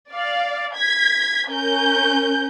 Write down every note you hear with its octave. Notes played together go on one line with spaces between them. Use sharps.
D5 F5
G#6 B6
C#4 A#4 G6